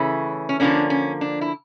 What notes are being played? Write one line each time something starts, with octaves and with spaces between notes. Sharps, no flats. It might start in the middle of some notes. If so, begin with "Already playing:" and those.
Already playing: C#3 E3 A3 C#4 E4
C#4
D3 F3 A#3 C#4 D4
C#4
D4
E4